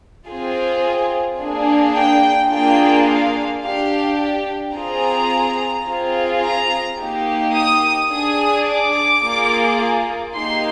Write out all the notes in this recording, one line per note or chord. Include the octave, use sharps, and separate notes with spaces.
C4 F4 G#4
A#3 D4 G#4
G5
A#3 D4 F4 G#4 G5
F5
D4 G4 F5
C4 F4 G#4 A#5
C4 F4 G#4
A#5
A#3 D#4 G4
D#6
D4 G#4 D#6
D6
A#3 F4 G#4
A#3 D#4 G4 C6